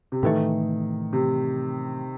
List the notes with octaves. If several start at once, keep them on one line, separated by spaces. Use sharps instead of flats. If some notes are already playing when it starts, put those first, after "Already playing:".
C3
A2 D#3 E3 A3
C3